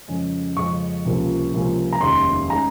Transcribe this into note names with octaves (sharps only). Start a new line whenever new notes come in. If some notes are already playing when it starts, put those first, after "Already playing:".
F2 C#3 G#3 C#4
F2 C#3 G#3 C#4 C#6
C#2 C3 F3 A#3 C#4
C#2 C3 F3 A#3 C#4
A#5
F1 D#2 D#3 G#3 C#4 C6
D#3 G#3 C#4 A#5